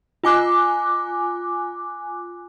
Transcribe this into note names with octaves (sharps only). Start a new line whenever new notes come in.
F4 G#5 D6 F#6